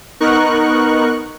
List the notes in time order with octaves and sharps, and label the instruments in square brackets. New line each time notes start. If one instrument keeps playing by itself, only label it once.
[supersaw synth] B3 D#4 A#4 C#6 F#6